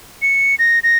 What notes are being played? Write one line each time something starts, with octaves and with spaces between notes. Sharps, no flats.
C#7
A#6
A#6